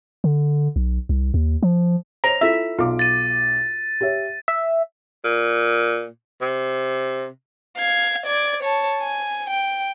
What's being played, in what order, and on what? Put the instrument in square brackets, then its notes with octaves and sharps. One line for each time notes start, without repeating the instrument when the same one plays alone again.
[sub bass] D3
B1
C2
D#2
F3
[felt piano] C5 C#5 [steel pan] A#5
[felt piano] E4 F4 A4 [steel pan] E5
[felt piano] B1 D6 [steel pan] F4
[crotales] A6 D#7
[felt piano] G4 C#5 E5
[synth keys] E5
[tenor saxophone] A#2
C3
[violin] F5 G#6
D5 G#6
C#5 A5
G#5
G5